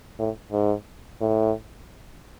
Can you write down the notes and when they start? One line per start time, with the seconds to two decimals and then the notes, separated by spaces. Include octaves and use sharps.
0.19 A2
0.52 G#2
1.21 A2